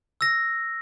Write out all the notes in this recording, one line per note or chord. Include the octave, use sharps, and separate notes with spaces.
E6 A#6